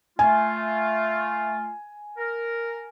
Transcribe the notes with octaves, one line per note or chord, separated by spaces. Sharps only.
A3 F4 G#5
A#4